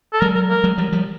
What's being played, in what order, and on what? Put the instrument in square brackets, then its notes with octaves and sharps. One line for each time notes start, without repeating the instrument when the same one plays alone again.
[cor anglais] A4
[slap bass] F#3 G#3 [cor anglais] A#4
[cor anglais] A#4
A#4
[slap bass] F#3 G#3
F3 G3
F3 G3